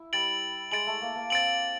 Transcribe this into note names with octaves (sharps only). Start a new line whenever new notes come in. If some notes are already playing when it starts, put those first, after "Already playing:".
Already playing: E4
G3 A6 D7 F#7
G#3 A6 D7 F#7
A3
A#3
A#3
C4 A6 D7 F#7